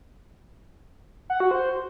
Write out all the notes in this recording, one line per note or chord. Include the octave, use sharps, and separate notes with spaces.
F#5
F#4
C5